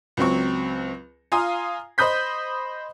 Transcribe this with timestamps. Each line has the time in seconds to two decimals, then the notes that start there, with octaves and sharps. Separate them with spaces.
0.17 C#2 F#3 C4 C#6
1.32 F4 F5 G#5 A#5 C6 D#6
1.98 C5 D#5 B5 D#6 G6 B6